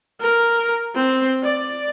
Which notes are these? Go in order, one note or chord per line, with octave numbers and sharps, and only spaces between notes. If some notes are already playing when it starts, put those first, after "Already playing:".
A#4
C4
D5